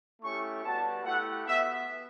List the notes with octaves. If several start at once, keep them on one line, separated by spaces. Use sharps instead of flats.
A3 C#4 E4 G4 C#6
G3 B3 F#4 A5
A3 E4 G4 F#5
B3 F#4 E5